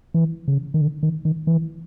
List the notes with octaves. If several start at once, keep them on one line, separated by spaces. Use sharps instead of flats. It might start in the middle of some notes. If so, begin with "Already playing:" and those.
E3
C#3
D#3
D3
D#3
D#3
E3